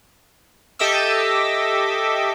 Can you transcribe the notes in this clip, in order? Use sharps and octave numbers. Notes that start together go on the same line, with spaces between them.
G4 A4 D#5 E5 D6 E6